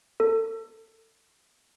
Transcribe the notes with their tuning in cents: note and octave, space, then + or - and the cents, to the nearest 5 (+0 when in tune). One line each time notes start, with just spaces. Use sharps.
A4 +30